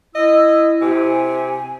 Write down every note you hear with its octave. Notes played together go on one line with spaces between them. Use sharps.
E4 D#5 E6
C3 G#5